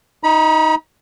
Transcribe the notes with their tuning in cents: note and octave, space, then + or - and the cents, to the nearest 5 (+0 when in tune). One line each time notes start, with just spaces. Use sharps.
D#4 +10 B5 -35